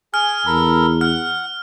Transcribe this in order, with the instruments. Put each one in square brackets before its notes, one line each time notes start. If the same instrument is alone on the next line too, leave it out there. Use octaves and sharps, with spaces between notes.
[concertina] G#4 G#5 [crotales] F6
[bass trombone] E2 [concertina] A4 A#4 B5
[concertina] F#5 [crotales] F6